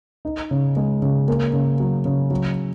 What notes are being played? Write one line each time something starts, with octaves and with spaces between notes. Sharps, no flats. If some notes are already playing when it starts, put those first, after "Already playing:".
D#4
C#3
G#3
C#3
A#3
C#3
F#3
C#3
F#3